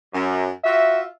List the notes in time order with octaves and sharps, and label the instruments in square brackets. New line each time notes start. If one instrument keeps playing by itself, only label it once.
[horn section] F#2
F4 F#4 E5